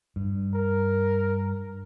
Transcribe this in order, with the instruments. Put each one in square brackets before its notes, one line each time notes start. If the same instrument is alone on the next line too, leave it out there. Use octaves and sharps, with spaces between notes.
[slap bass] G2
[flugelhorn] A#4